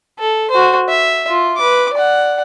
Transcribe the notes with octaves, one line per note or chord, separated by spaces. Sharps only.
A4
F#4 C5
E5
F4
B4 D6
D5 F#5